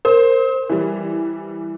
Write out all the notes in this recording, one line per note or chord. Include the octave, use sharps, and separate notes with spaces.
A#4 C5
E3 G3